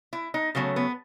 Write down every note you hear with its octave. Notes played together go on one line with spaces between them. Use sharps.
E4
D#4
C#3 F#3 A3 B3
B3